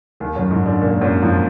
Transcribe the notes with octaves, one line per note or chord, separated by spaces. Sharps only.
D#2 D#3
F#2 F#3
G#2 G#3
D3 D4
A#2 A#3
F#2 F#3
F2 F3